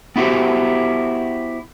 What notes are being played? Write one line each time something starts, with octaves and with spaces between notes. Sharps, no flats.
B3 E4 F#4 G4 C5